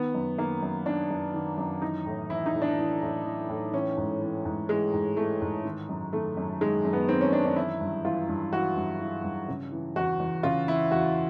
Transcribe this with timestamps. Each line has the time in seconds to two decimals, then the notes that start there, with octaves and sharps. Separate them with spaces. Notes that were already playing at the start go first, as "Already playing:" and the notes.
Already playing: D#3 B3
0.14 F#2
0.38 D#3 A#3
0.63 F#2
0.86 D#3 D4
1.10 F#2
1.34 D#3
1.58 F#2
1.82 E3 D#4
2.06 A2
2.30 E3 E4
2.46 D#4
2.54 A2
2.62 D4
2.78 E3
3.02 A2
3.25 E3
3.49 A2
3.74 E3 C#4
3.97 G#2
4.21 E3
4.45 G#2
4.69 E3 G#3
4.94 G#2
5.17 E3 A3
5.42 G#2
5.65 D#3
5.89 F#2
6.13 D#3 A3
6.37 F#2
6.61 D#3 G#3
6.85 F#2
6.93 B3
7.08 D#3 C4
7.21 C#4
7.32 F#2 D4
7.45 D4
7.56 E3 E4
7.81 G2
8.04 E3 F4
8.28 G2
8.53 E3 F#4
8.76 G2
9.00 E3
9.24 G2
9.48 C#3
9.72 E3
9.96 E2 F#4
10.20 E2
10.43 C#3 F4
10.68 E3 E4
10.91 E2 F#4